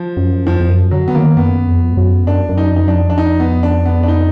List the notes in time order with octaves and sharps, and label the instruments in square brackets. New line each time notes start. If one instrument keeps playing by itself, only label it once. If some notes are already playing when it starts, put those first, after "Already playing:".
Already playing: [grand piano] F3
[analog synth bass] F#2
[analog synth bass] F2 [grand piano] F3
[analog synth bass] F2
F#2
[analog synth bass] D3 [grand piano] F#3
[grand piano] B3
[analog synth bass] D#3 [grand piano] A#3
[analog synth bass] F#2 [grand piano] B3
[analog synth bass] F2
G#2
F#2
[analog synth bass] F#2 [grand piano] D4
[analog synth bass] F#2
[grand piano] D#4
[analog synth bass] F2 [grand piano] D#4
[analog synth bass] F#2 [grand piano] D4
[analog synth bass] F2
[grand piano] D4
D#4
B3
D4
B3
D4
D#4